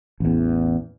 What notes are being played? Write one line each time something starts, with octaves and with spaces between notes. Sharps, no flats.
A1 E2